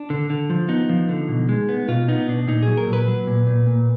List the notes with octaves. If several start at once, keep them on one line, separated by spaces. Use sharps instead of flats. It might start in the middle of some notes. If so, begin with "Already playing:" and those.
Already playing: D4
D3
D3
F3
B3 D#4
F3
D3
B2
G#3
B3
B2 F4
B3 D#4
B2 D4
A#2 D#4
F#3 G#4
A#4
A#2
B4
F#3
A#2
A#2
A#2